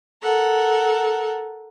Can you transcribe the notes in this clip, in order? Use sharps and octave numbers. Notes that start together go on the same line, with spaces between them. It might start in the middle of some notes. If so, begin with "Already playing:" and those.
A4 A#4 F#5